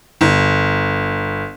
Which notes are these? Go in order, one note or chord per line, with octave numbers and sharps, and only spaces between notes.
G1